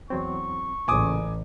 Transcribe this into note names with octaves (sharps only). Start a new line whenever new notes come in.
E2 F#3 C4 C#6
A1 A#2 C#3 G#5 D6 D#6